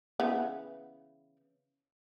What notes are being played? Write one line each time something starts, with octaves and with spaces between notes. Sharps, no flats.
C#3 E3 B3